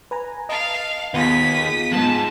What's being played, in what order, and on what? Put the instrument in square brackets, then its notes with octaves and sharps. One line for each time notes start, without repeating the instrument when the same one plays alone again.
[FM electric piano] B4 G#5 A#5
[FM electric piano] D#5 A5 [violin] F5
[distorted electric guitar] D#2 [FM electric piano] B3 F4 G#4 [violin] D#6 B6
[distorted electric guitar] F2 G#2 [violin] A5